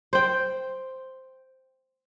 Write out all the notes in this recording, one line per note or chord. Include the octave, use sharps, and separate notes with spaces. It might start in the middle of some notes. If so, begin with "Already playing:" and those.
C5 G5